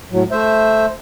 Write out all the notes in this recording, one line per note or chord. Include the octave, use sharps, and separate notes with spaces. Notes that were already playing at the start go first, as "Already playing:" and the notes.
A2 F#3
A3 C5 E5